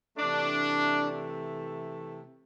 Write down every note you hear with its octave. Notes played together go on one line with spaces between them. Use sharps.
C3 E3 A3 D4